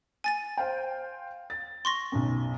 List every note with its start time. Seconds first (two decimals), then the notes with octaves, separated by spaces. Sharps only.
0.24 G#5 A6 D#7
0.57 C5 F5 G5
1.50 A6
1.85 C6 C#6 A#6
2.12 B1 F#2